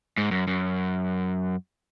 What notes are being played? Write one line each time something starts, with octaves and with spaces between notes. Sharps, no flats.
G#2
F#2
F#2